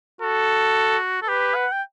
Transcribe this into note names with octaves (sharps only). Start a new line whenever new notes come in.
F#4 A4
A4
G4 B4
F#5
G5